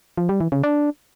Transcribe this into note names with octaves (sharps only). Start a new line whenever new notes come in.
F3
G3
E3
C#3
D4